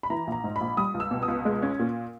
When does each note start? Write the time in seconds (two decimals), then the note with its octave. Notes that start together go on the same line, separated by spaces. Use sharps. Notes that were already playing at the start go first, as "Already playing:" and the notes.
0.03 B5
0.10 E3 A#5
0.27 A#1 A#5
0.44 G#2
0.56 A#1 B5
0.77 G3 D#6
0.94 C#2
1.00 E6
1.11 B2
1.23 D#6
1.28 C#2
1.45 G#3
1.62 C#4
1.79 A#2